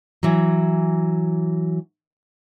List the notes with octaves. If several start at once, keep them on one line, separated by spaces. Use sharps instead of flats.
E3 F#3